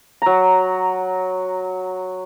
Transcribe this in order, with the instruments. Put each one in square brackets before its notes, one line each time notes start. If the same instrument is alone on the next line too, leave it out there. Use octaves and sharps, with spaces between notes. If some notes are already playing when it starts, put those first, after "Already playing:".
[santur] F#3 A#5